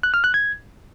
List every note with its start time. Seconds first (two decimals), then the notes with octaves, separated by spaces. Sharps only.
0.03 F#6
0.14 F6
0.24 F#6
0.34 G#6